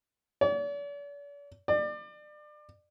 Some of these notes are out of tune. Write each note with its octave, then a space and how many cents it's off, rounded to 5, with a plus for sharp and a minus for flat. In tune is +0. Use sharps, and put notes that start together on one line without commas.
D5 -45
D5 +30